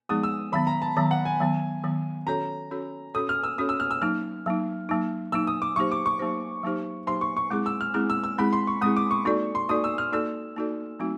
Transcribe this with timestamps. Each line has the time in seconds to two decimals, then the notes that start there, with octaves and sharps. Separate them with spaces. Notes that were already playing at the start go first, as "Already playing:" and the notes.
0.09 F3 G#3 B3 D#4 G#4 D#6
0.23 E6
0.52 D#3 F#3 B3 B5
0.67 A#5
0.82 A5
0.96 D#3 F#3 B3 A#5
1.11 F#5
1.25 G#5
1.40 D#3 F#3 B3
1.84 D#3 F#3 B3
2.27 C#4 F#4 A4 C#5 A#5
2.71 C#4 F#4 A4 C#5
3.14 C#4 F#4 A4 C#5 D#6
3.29 F6
3.43 E6
3.58 C#4 F#4 A4 C#5 D#6
3.69 E6
3.80 F6
3.91 E6
4.02 F#3 A#3 D#4 F6
4.46 F#3 A#3 D#4
4.89 F#3 A#3 D#4
5.32 F#3 A#3 D#4 E6
5.47 D#6
5.62 D6
5.76 F#3 A#3 D#4 G4 C5 C#6
5.92 D6
6.06 C#6
6.19 F#3 A#3 D#4 G4 C5
6.63 F#3 A#3 D#4 G4 C5
7.07 F#3 A#3 D#4 G4 C5 C6
7.21 C#6
7.37 C#6
7.51 G#3 C4 E4 G#4 D6
7.66 E6
7.81 F6
7.94 G#3 C4 E4 G#4 F6
8.10 E6
8.24 E6
8.38 G#3 C4 E4 G#4 B5
8.53 C6
8.67 C#6
8.81 G#3 C4 E4 G#4 D#6
8.97 D6
9.11 C#6
9.25 A#3 D#4 F#4 A4 D5 C#6
9.55 C6
9.69 A#3 D#4 F#4 A4 D5 D#6
9.84 E6
9.98 F6
10.12 A#3 D#4 F#4 A4 D5 E6
10.56 A#3 D#4 F#4 A4 D5
10.99 F#3 A3 C4 D#4 F#4